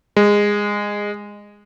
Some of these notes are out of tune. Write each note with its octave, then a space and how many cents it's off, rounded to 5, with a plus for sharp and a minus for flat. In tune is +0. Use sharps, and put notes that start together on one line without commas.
G#3 -15